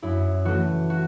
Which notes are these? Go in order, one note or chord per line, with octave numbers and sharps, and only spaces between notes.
F#2 E4
E3 A3 F#4
F#4